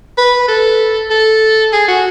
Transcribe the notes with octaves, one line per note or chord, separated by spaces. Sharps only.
B4
A4
A4
G#4
F#4